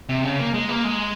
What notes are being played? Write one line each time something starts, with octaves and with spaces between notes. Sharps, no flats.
C3
C#3
A#3
G#3
A#3
G#3